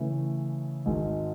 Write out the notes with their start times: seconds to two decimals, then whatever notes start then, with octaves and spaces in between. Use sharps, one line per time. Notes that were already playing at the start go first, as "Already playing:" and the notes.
Already playing: C#3 E3 A3 E4
0.86 G#1 G#2 G#3